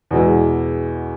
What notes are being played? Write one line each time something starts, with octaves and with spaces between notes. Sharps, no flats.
E2 B2 G#3 E4